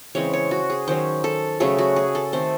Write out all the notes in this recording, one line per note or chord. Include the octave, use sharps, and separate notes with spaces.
C#3 E3 G#3 C4 C#5
C#5
F#4
G#4
D#3 F#3 C#4 C5
A4
C#3 F#3 A3 G#4
F#4
G#4
A4
D#3 A3 C4 C5